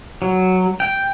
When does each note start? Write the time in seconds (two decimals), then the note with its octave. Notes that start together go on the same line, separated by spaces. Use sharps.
0.22 F#3
0.80 G5